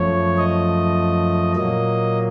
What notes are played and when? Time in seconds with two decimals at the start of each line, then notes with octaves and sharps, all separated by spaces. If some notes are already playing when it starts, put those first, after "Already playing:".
Already playing: F#2 F3 A3 C#5
0.37 D#5
1.56 A#2 F#3 A#3 D#5